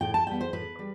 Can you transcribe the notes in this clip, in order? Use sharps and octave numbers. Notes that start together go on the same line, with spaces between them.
A2 G5
A5
G3 B3 G5
C5
A2 B4
G3